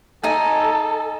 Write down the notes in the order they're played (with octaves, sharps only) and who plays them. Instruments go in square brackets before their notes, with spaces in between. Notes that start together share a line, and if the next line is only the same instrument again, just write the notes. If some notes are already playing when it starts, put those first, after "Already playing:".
[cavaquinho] D#4 G#5 [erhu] A4